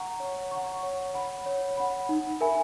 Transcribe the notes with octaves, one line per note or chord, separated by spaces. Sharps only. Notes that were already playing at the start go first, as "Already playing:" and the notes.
Already playing: F#5 A#5 C#6
C#5
F#5 A#5 C#6
C#5
F#5 B5
C#5
F#5 B5
D#4
A#4 E5 G#5 B5